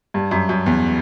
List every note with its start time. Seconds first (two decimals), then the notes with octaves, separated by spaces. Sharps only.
0.14 G2
0.31 F#2
0.49 F#2
0.66 E2